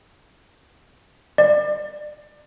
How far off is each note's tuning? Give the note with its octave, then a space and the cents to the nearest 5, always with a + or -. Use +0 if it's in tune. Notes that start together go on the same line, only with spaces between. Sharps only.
D5 +30